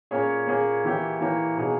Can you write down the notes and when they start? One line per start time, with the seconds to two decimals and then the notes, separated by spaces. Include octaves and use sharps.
0.11 A#2 A#3 C#4 G#4 C#5
0.47 A#2 A#3 C#4 G#4 C#5
0.84 E3 A#3 E4 G4 C#5
1.20 E3 A#3 E4 G4 C#5
1.57 B2 A#3 D#4 G#4 C#5